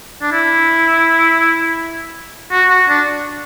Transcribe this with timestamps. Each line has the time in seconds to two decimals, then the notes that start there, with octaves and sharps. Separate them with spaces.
0.22 D4
0.32 E4
2.51 F#4
2.70 F#4
2.88 D4